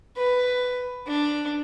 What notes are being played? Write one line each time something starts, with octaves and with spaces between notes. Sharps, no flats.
B4
D4